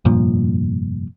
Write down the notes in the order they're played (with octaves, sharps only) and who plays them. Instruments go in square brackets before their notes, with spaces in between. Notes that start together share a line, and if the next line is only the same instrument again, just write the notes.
[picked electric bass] F1 G2 A#2 F3